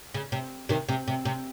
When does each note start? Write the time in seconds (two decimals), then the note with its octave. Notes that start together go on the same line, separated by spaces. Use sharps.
0.14 C#3
0.32 C3
0.69 C3 D#3
0.89 C3
1.08 C3
1.25 C3